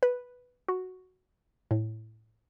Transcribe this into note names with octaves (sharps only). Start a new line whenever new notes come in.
B4
F#4
A2